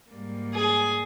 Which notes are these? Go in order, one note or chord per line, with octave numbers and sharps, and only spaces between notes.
G#2 G3 A#3
G#4